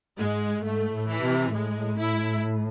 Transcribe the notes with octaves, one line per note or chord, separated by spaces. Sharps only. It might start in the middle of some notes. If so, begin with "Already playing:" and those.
G#2 G#3
G#2 A3
A2
E3
C3
A2 G#3
E4